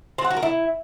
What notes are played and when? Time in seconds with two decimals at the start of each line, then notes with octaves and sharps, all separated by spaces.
0.18 C4
0.24 F#5
0.30 F#4
0.37 A#4
0.43 E4